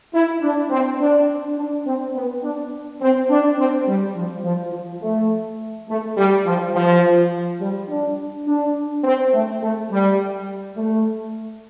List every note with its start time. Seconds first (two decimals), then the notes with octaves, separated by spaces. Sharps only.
0.13 E4
0.42 D4
0.71 C4
1.00 D4
1.57 D4
1.86 C4
2.15 B3
2.43 D4
3.01 C4
3.30 D4
3.58 C4
3.87 G3
4.15 F3
4.44 F3
4.72 F3
5.02 A3
5.88 A3
6.17 G3
6.45 F3
6.75 F3
7.60 G3
7.89 D4
8.46 D4
9.04 C4
9.33 A3
9.62 A3
9.90 G3
10.77 A3